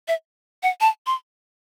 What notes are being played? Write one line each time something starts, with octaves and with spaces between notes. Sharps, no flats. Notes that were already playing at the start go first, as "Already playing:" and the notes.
E5
F#5
A5
C6